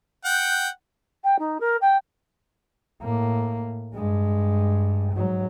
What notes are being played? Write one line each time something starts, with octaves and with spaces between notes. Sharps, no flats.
F#5 G5
G5
D#4
A#4
G5
A2 A#3
G2 G#3
G#2 F#3